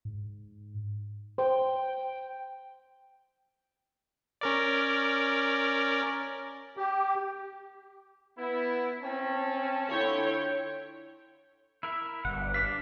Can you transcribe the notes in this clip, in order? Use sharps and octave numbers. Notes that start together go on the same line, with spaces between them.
G#2
C5 G5
C#4 A#4 D5
G4
B3 E4
C4 C#4 A5
D3 E4 F4 C#5 G5
E4 A#4 E5
G1 G3 F#5
D4 D5 F5 B6